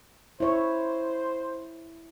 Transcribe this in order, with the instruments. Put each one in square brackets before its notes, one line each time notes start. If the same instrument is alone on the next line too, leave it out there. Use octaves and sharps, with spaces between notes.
[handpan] E4 C#5 [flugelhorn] C5